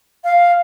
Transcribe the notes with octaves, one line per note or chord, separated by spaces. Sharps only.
F5